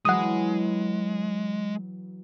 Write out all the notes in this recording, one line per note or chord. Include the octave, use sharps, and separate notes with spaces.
E3 F#3 G#3 F#5 D#6